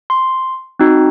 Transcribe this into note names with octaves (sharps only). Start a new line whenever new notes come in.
C6
C4 D#4 F#4